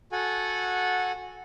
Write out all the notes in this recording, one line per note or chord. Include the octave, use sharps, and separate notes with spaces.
F#4 A4 F#5 G#5